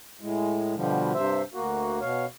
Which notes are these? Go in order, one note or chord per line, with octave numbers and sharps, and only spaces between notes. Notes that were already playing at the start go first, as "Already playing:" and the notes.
A2 G#3
B2 D3 F3 G3
G2 C3 C5 E5
D2 A#3 F#4
B2 C#5 F5